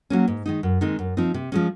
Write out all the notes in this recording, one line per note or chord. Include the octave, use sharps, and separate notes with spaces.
F#3 A#3 C#4
G#2
D#3 G#3 D#4
F#2
D#3 G#3 C4 D#4
F#2
F3 C4 D#4
C3
F3 G#3 C#4